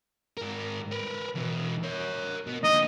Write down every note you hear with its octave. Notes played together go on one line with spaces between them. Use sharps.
G#2 A#4
A#4 B4
E2 B2
A#4 C#5
B2
A#2 D3 D#5